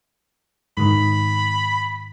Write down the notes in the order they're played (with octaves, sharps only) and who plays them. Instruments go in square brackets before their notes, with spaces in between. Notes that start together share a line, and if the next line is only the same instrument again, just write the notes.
[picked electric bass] G#2 D#3 [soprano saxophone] B5